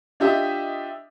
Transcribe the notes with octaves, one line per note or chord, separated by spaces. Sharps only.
D4 F4 G4 D#5 E5